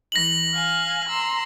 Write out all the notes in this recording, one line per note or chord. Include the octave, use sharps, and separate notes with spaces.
E3 A#6 F#7
F5 G#5
A#5 C6 E6